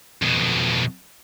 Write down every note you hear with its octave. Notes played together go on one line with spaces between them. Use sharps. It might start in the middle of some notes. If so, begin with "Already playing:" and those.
F2 B2